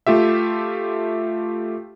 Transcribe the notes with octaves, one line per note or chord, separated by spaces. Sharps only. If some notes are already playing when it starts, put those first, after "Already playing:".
A3 F4 G4 E5